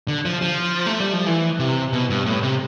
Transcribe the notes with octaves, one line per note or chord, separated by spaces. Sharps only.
D3
F3
F3
A3
G3
F3
E3
C3
B2
G2
A2
C3